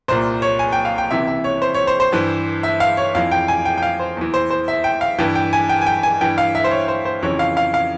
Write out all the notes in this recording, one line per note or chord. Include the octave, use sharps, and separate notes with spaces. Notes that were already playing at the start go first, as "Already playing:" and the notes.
C2 A#2 C5
C#5
G#5
G5
F5
G5
C#2 C3 E3 E5
E5
C#5
C5
C#5
C5
C5
G2 E3
E5
F5
C#5
F2 E3 F5
G5
G#5
G5
G5
F5
C5
E2 E3
C5
C5
E5
G5
F5
G2 E3 G5
G5
G#5
G5
G#5
G5
G#5
G2 E3 G5
F5
E5
C5
C#5
C5
C5
F2 C#3 E3 C#5
F5
F5
F5